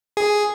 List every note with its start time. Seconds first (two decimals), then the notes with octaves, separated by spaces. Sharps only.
0.17 G#4